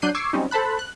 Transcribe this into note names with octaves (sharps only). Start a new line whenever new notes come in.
F#3 D4 F#6 G6 C7 D#7
C#6 D6 E6 G#6 C7
F#3 G3 C4 C#4 D#4
A4 C5 A5 B5 F#6
F#6